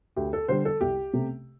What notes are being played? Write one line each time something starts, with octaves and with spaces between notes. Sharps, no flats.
D2 G4
A4
D3 G3 C5
A4
C2 G4
C3 A3